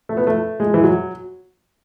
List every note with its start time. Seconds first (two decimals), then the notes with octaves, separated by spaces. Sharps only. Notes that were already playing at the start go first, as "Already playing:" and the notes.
0.09 A3
0.17 B3
0.27 A3
0.60 G#3
0.74 E3
0.84 F#3